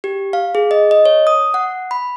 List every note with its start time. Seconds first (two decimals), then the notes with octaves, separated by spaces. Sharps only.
0.04 G4
0.33 F5
0.55 G#4
0.71 D#5
0.91 D#5
1.06 C#5
1.27 D#6
1.54 F#5
1.91 B5